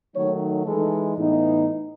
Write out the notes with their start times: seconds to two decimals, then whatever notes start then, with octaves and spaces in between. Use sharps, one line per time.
0.15 D#3 F#3 A3 D#4 C#5
0.66 E3 G#3 D#4 A4
1.18 A2 E3 B3 D#4